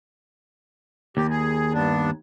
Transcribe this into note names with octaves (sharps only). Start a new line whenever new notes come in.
D#2 G4
G#4
G2 B3 D4